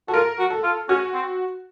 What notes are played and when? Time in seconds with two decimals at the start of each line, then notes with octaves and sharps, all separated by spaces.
0.08 F#4 A4
0.13 F4 A#4
0.39 F#4
0.50 A4
0.63 F4
0.89 C#4 F#4
1.14 C4